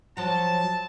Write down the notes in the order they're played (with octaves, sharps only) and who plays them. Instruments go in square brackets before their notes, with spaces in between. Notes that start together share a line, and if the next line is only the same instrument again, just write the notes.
[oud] F3 F#3 [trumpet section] A5